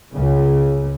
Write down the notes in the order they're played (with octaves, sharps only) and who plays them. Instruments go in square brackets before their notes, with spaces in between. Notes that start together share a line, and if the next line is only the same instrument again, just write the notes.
[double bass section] C#2 C#3